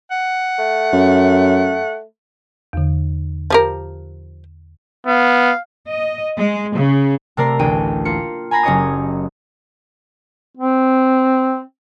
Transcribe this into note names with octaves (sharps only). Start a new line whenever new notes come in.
F#5
A3
F#2
E2 D3
F3 G4 A#4
B3 F5
D#5
G#3
C#3
C3 A3 A#4 D5 A#5 C7
A1 D2 G5 D#7
A#3 F4 C#7
G#5 A#5 B5 A#6 C7
F#1 C#4 G4 C#5 D#5 D#6
C4